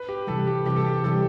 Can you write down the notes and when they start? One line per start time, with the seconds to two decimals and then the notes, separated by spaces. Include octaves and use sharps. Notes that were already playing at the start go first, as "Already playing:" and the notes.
Already playing: B4
0.09 G4
0.27 C3 E3 G3 A4
0.47 G4
0.65 C3 E3 G3 G4
0.76 A4
0.86 G4
1.04 C3 E3 G3 A4